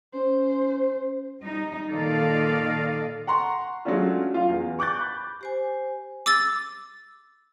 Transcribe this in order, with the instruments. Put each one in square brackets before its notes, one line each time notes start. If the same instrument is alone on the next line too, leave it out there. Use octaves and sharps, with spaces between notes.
[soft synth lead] C#4 [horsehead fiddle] C5
[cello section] G3 D#4
A#2 D#3 A4 D5 D#5 F5
[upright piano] F#5 A#5 C6 C#6
F#3 G#3 A3 C#4 D4 F4
F4 F5
E2
C#6 D6 F#6 G6 A6
B5
[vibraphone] G4 C5 G#5
[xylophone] D6 E6 A6